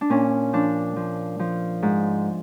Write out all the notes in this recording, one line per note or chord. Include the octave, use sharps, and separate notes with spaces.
D4
A#2 C#4
F3 D4
F3
F3
G#2